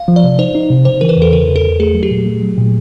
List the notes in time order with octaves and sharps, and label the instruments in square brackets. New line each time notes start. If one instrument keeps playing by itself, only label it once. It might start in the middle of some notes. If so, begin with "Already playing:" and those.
Already playing: [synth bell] F5
[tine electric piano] F3
[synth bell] D5
[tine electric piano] C3
[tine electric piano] D#4 [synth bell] C5
[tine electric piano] D#4
C3
[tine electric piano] C#3 [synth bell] C5
[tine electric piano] E3 [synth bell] A#4
[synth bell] B4
[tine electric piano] E2 [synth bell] A4
[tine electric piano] C#3 [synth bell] A#4
[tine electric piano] E2
[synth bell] A4
[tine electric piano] E2
[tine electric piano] A3 [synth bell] G#4
[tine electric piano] F#3
[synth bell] G4
[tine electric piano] A#2
A3
F#3
A#2